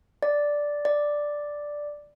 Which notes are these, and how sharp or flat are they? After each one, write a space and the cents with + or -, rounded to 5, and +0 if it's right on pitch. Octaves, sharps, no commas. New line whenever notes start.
D5 -5
D5 +0